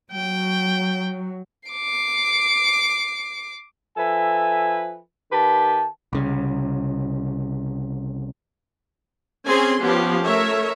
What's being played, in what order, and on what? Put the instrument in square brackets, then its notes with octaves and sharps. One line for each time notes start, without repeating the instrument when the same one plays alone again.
[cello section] F#3 [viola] G5
[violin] D6 C7
[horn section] F3 A4 B4 E5 G#5
D#3 G4 B4 A5
[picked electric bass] C2 C#3
[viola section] C4 C#4 G#4 G#5 C6
F3 B3 C#4 G4
A3 A#4 C#5 E5